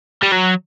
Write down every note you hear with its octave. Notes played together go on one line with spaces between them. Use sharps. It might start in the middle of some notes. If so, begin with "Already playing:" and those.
G3
F#3